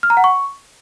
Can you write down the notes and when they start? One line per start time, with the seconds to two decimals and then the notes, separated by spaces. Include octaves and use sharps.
0.03 F6
0.10 A#5
0.17 F#5
0.24 C#6